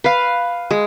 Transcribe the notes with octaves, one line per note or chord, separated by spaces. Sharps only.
B4 F5
G#3